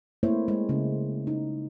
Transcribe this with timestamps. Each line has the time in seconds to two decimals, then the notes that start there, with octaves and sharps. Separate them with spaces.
0.23 A3 A#3 C4 E4 C5 C#5
0.48 G#3
0.69 C#3
1.27 D#4